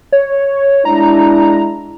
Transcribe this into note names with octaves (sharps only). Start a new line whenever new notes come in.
C#5
G#3 D4 E4 A#5